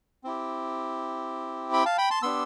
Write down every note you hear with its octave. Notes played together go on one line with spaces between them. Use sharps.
C4 E4 G4
G5 B5
F5 A5
G5 B5
A5 C6
B3 D4 G4 C6 E6